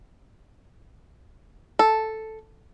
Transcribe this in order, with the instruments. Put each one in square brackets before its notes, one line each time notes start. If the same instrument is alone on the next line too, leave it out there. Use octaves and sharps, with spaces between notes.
[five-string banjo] A4